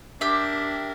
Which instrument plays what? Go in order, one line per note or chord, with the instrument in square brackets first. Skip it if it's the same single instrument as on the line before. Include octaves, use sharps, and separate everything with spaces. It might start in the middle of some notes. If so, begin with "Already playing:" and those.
[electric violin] D4 A#4 [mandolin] G4 E5